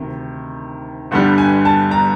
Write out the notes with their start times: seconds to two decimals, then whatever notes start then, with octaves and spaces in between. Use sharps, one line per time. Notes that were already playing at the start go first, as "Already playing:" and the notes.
Already playing: D2 C3 D#3
1.11 G1 G2 D3 G3 F#5
1.38 G#5
1.65 A5
1.91 A#5